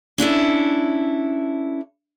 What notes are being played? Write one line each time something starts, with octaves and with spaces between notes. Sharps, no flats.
C#4 D4 E4 A4